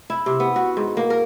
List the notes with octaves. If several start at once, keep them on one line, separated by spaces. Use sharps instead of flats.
E4
C3
B3
F#4
G#2
A#3
A#4